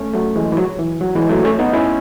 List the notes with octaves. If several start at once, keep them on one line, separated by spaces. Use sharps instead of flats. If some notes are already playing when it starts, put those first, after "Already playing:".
Already playing: A3 C#4
F#3 A3
E3 G#3
E3
F#3
E3
F#3
E3 G#3
F#3 A3
A3 C#4
B3 D#4
C#4 E4